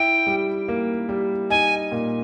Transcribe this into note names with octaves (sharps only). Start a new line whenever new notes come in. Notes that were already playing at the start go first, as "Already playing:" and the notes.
Already playing: E4 G5
G3
A#3
G3
D#4 G#5
A#2